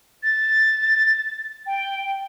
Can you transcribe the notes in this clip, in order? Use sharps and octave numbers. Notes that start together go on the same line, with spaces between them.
A6
G5